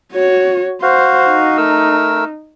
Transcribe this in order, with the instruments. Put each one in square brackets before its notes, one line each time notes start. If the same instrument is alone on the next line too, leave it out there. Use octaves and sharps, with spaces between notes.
[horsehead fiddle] F#4 C#5
[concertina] F#4 F5 [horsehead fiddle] C5
[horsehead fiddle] D#4
[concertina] A3 A#4 E6